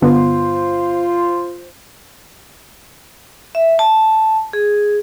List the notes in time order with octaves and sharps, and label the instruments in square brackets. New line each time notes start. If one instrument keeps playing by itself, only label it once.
[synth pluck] G2 D3 B3 [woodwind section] F4 C5
[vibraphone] E5
A5
G#4